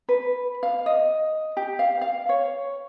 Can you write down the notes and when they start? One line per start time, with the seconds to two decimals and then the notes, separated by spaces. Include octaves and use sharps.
0.09 B4
0.63 F5
0.86 D#5
1.57 G4
1.79 F5
2.01 F5
2.29 C#5